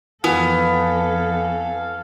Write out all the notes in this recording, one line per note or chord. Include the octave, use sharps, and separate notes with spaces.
F2 E3 B3 A4 F5